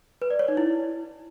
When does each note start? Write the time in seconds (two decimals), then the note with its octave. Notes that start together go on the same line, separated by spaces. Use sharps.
0.22 B4
0.30 D5
0.39 C#5
0.48 D#4
0.57 E4